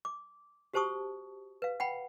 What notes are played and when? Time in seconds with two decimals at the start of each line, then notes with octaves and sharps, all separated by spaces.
0.05 D6
0.73 F#4 G4 C5 A5 C#6 D#6
1.62 B4 F5
1.80 F#5 G5 B5